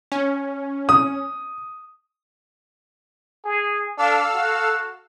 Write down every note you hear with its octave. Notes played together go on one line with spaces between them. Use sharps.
C#4
D#6
G#4
D4 A4 F5 E6
F#4